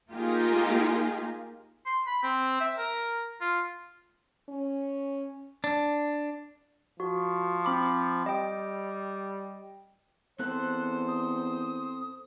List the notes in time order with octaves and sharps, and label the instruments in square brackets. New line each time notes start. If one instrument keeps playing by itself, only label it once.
[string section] A#3 D#4 F4 G4 G#4
[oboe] C6
B5
C4
E5
A#4
F4
[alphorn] C#4
[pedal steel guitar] D4
[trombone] F3 [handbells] F#4
[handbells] C4 B5 D6
[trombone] G3 [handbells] D#5 G5
[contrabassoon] E2 [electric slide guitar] C4 A4 [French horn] C5 [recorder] F#6
[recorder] D#6